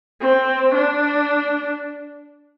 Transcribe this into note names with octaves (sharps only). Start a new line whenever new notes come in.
C4
D4